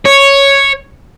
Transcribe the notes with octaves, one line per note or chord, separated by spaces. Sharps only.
C#5